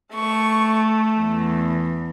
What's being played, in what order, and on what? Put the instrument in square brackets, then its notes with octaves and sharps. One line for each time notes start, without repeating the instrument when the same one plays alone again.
[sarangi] A3 [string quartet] C#6
[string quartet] E2